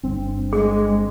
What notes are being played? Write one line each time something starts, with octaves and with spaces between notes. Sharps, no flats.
G1 G2 C4
G#3 G#4